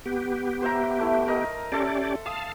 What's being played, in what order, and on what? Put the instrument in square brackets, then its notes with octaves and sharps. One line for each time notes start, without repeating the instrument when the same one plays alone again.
[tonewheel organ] B3 G4
[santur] C5 E5 A#5
A3 E4
A#4 D#5
[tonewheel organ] C#4 G4 D5 [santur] A4 E5 C6
[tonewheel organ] F5 A5 [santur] D#6